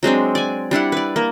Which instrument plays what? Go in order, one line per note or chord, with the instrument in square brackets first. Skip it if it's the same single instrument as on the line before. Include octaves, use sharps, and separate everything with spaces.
[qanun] F#3 G#3 C4 D4
D5 G#5
G3 D4 E4 F#5
B4 D5
A#3